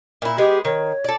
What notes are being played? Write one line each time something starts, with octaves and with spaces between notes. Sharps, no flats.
A#2 E4
G#3 B3 G4 G#4
D#3 C#5
A4 D5